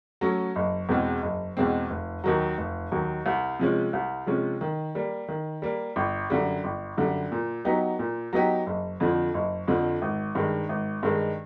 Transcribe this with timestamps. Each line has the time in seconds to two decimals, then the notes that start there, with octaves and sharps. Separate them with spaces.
0.21 F#3 A3 C#4
0.56 F#1
0.89 E2 B2 G#3 C4
1.23 F#1
1.57 E2 B2 G#3 C4
1.90 F1
2.24 D#2 D#3 F#3
2.58 F1
2.92 D#2 D#3 F#3
3.26 C2
3.59 C3 F3 G#3 C#4
3.93 C2
4.27 C3 F3 G#3 C#4
4.61 D#3
4.95 G3 A#3
5.28 D#3
5.62 G3 A#3
5.96 G1
6.30 F#2 D3 G3
6.64 G1
6.97 F#2 D3 G3
7.32 A#2
7.65 F#3 B3 D#4 G4
7.99 A#2
8.33 F#3 B3 D#4 G4
8.66 F#1
9.00 F2 D3 F3
9.34 F#1
9.68 F2 D3 F3
10.02 G#1
10.35 G2 D#3 G#3
10.69 G#1
11.03 G2 D#3 G#3